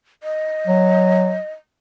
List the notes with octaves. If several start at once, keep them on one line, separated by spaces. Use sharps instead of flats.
D#5
F#3